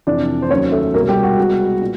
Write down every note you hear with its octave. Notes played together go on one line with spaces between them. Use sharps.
F2 C3 E3 A3 D4 D5
C5
D#2 D#3 F#3 C#4 C#5
A3 A4
C2 B2 G#3 A#3 A#4
G3 G4
F#4
C2 B2 G#3 B3
A#2